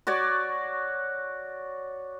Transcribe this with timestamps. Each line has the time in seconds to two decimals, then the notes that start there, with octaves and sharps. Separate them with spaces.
0.07 F#4 C#5 D5